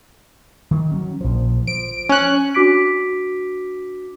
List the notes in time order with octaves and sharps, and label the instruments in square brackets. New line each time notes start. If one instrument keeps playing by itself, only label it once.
[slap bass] D#3
F#3 C#4
A#1 F3
[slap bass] F3 [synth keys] D7
[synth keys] C#4 F#6
[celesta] D4 F#4 D6 B6 D7